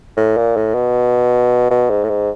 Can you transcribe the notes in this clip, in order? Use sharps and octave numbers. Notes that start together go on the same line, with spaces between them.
A2
A#2
A2
B2
B2
G#2
A2
G#2